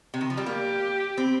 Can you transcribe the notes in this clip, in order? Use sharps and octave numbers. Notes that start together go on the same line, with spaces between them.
C3
D#3
F3
G3
A#3 G4
C4